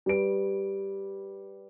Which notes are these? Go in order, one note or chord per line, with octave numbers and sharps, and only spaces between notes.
G3 B4 D7